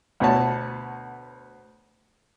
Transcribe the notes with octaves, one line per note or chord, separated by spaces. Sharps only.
D2 B2 B3 C#5 A5